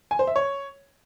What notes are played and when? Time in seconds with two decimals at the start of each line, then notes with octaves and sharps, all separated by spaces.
0.11 G#5
0.19 C5
0.27 E5
0.36 C#5